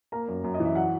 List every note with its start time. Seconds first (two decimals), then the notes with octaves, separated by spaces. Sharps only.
0.12 A#3 A#5
0.28 F#2
0.44 F#2
0.54 D#5
0.60 E3 E5
0.75 F#3 F#5